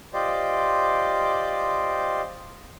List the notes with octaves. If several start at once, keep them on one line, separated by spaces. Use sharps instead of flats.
F4 G4 C5 D5 D#5